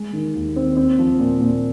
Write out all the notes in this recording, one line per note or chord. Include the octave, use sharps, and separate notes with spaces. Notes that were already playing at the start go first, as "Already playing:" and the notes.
Already playing: G#3
D#3
D#2
C4
C4
F3
A#2
A#2